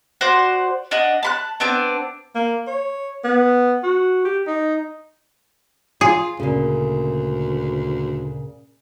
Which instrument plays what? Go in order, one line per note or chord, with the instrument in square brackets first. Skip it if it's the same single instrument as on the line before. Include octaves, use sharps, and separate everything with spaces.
[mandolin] F#4 C5 D5 F#6
D4 D#5 F#5
A5 B5 F#6
B3 C4 D4
[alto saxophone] A#3
C#5
B3
F#4
G4
D#4
[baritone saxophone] F4 [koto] G#4
[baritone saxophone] D2 [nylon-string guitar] A#2 C#3